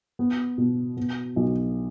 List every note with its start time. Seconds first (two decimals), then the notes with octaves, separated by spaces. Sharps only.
0.19 B3
0.58 B2
0.97 B3
1.36 B1